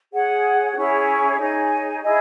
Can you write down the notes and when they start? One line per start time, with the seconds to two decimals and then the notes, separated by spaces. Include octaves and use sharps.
0.12 G#4 C#5 F#5
0.75 C#4 E4 G#4 C#5
1.38 D#4 G#4 C#5 G#5
2.02 E4 G#4 D#5 G#5